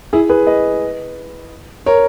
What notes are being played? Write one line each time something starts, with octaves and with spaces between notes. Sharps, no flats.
E4 G#4
G#4 B4
B4 D#5
A#4 C#5